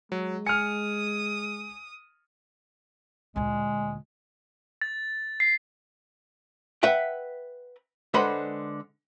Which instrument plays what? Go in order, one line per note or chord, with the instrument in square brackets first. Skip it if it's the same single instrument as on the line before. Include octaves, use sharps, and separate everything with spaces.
[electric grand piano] F#3 [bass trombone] G#3
[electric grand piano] G#5 [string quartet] D#6 [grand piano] F6 C#7
[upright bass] D2 A#2 [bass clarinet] G#3
[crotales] A6
C7
[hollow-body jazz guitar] B4 E5 F#5 G5
D3 G#3 B4 C5 F#5 B5